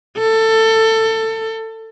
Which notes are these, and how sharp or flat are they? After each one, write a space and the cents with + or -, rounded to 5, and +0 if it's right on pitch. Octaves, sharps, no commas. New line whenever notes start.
A4 +20